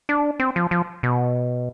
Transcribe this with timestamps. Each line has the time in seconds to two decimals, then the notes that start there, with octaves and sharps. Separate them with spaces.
0.09 D4
0.40 C4
0.56 F3
0.71 F3
1.03 B2